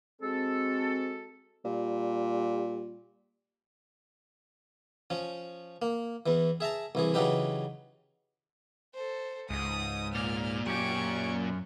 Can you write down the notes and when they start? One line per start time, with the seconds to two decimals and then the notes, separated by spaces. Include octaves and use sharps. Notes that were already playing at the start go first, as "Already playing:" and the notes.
0.22 G#3 C4 F#4 A4
1.65 A#2 G3
5.10 F3 C#4
5.82 A#3
6.26 E2 E3
6.60 G#4 E5 A5 A#5
6.95 C2 E3 G#4
7.14 C#3 E3 F#3 D#4 G4 B4
8.94 A4 C5
9.50 C#2 G#2 G#3 D#6
10.14 A#2 F6
10.66 F#2 C#4 G4 C#6 D7